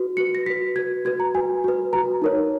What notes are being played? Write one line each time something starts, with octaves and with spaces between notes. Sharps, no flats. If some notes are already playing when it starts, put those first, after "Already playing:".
Already playing: F#4 B4
F#4 B4 C#7
A#6
F#4 B4 B6
F#4 B4 G#6
F#4 B4 G#6
A#5
F#4 B4 G#5
F#4 B4
F#4 B4 A#5
D#4 A#4 C#5